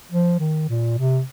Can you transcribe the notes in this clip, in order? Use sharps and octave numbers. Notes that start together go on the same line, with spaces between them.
F3
D#3
A#2
C3